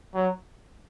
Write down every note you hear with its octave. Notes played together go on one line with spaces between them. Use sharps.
F#3